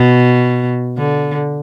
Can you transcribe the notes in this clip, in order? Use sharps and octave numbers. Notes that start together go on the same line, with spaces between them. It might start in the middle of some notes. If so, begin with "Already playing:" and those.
Already playing: B2
D3